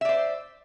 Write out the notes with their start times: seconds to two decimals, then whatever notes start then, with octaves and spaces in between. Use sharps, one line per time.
0.01 E5
0.05 D5
0.09 C5